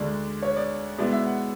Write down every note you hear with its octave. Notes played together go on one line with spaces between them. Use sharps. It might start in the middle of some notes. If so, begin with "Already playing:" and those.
Already playing: D2 D3 G#3 D4 D5
C#5
D5
B2 G#3 B3 E4 D5
E5
F#5